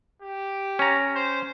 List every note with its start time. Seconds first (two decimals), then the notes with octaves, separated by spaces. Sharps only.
0.22 G4
0.79 C#4 A#5
1.16 C5